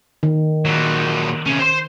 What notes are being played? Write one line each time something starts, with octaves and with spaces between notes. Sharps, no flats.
D#3
A#2 F#3
C3 C#4
C5 C6